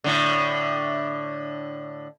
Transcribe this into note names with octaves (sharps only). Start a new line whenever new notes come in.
A2 D3